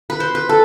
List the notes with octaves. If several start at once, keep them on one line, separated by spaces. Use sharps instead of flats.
B4
C5
B4
A4